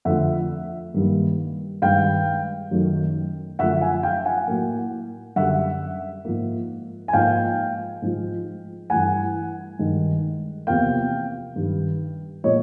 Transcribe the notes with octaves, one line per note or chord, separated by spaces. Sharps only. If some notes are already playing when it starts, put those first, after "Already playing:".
F2 D3 F3 A3 E5 F#5
G2 D#3 G3 A#3
G2 D#3 G#3 F5 G5
F#2 D#3 F#3 A3
F#2 D3 F3 A3 E5 F#5
F#5 G#5
F5 G5
F#5 G#5
A2 F#3 A#3
F#2 D3 G3 E5 F#5
G#2 F3 A#3
G#5
G#2 F3 A#3 F5 G5
G#2 F3 G#3
G2 E3 A3 F#5 G#5
G2 D#3 G#3
E2 C3 F3 A#3 F5 G5
G2 D#3 G3
A#2 F3 G#3 C#5 D#5